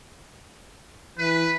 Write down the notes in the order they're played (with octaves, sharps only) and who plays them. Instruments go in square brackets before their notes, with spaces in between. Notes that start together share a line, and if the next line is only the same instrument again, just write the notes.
[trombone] E3 [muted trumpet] B4